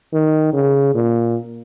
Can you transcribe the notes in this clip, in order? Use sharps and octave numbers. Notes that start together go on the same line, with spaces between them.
D#3
C#3
A#2